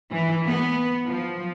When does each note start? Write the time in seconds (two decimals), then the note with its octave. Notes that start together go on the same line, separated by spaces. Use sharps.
0.12 E3
0.47 B3
1.06 F3